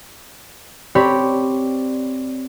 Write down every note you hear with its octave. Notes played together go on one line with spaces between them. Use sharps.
C4 G4 C#5 D5 B5